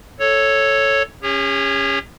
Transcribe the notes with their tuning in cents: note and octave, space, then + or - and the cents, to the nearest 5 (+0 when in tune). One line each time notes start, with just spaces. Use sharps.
A4 +0 C#5 +0
C#4 +0 G#4 -45 C#5 +0